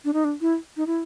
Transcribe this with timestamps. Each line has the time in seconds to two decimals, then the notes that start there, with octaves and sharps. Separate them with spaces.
0.05 D4
0.13 D#4
0.25 D4
0.41 E4
0.77 D#4
0.87 E4